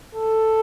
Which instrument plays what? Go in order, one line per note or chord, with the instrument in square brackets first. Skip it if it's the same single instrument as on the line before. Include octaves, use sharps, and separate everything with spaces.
[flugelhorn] A4